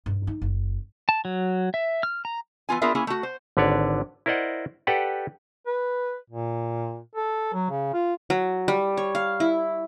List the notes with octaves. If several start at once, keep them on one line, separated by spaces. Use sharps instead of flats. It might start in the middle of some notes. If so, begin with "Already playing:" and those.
G2
D#4
F#1
A5
F#3
E5
F6
A#5
E3 B3 F4 G#5
B3 D4 F4 G#4 A#4 E5
A#3 C#4 E4 G#4
A3 F#4
C5
G#1 D3 B4 C#5 D5
E4 A#4 C5 D5 D#5 F#5
G4 A4 B4 D5 F#5 G5
B4
A#2
A4
F#3
C#3
F4
F#3
G3
C#5
F5
E4